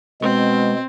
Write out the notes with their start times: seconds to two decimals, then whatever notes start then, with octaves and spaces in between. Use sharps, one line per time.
0.22 B2 G#3 C4